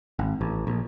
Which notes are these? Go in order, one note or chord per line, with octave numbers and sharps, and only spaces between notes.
G#1
A1
A#1